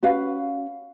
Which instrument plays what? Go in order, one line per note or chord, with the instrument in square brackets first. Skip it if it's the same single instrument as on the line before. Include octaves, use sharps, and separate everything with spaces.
[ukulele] C#4 F#4 B4 F5